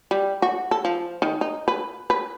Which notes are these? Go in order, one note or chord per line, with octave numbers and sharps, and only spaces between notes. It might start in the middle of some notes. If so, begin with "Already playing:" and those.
G3
F#4
A4
F3
D#3
D#4
B4
B4